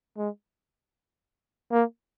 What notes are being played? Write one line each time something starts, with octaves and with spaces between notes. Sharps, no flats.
G#3
A#3